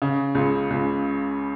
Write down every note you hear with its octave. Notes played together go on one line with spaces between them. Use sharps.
C#3
C#2
C#2